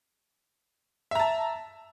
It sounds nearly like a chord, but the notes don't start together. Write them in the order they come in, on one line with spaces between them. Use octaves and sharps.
E5 A#5 A5